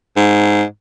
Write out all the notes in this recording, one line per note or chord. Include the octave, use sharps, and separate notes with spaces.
G#2